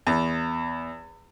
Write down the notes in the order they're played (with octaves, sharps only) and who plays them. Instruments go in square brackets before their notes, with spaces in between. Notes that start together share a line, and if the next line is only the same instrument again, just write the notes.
[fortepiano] E2